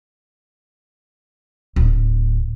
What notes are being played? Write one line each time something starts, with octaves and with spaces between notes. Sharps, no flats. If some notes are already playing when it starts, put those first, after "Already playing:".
D1